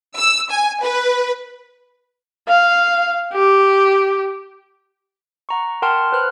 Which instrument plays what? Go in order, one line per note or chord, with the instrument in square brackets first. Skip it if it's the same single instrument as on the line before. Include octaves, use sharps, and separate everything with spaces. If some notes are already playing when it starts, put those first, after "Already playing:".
[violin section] E6
G#5
B4
[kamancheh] F5
G4
[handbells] F#5 A#5 C#6
A#4 F#5 G5 A5 C6 F6
B4 C5 F6 F#6